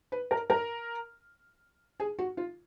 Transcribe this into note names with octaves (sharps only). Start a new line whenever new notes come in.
B4
A#4
A#4
G#4
F#4
F4